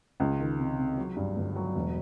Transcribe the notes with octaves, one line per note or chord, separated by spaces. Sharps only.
C#2
D#3
C3
C3
F#3
G2
G1
F#3
E1